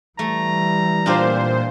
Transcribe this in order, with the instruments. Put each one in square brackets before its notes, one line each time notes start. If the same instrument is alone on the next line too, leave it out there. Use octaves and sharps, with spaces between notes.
[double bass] E3 G3 [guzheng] A3 [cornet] A#5
[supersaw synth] A#2 C5 [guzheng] D4 F4 G4